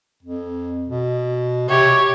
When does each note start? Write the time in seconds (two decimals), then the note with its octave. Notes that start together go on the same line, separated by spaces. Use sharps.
0.23 F2
0.88 B2
1.69 C3 G4 C#5